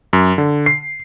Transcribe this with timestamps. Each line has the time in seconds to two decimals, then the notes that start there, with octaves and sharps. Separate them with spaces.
0.13 F#2
0.38 D3
0.66 C7